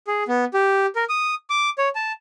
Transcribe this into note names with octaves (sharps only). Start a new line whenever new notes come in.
G#4
B3
G4
A#4
D#6
D6
C#5
A5